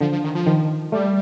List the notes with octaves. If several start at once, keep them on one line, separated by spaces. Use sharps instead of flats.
D3 F3
F3
D#3
F3
D#3
G3 A3